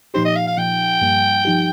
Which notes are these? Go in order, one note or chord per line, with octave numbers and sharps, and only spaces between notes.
A#2 F3 D#4 G4 C5
D#5
F5
F5
A#2 F3 D#4 G5
G2 G3 A#3
F3 D#4 G4